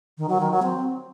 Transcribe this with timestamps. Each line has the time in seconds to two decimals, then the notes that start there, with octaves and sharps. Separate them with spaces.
0.18 D#3
0.29 F#3
0.40 D#3
0.52 F#3
0.63 C4